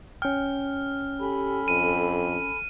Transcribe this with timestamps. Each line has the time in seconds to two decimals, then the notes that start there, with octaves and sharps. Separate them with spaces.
0.22 C#4 G5 F6
1.20 G4 A4 G#5 B5
1.68 F2 D#7